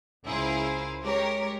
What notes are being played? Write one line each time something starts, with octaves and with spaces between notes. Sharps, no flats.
C#2 E4 G#4 A#4 C5 F5
G#3 G4 A#4 C#5